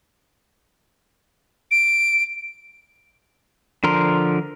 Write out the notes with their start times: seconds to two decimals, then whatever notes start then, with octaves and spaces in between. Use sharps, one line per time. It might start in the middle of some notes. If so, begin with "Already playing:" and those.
1.71 D7
3.84 D3 F3 A#4 C6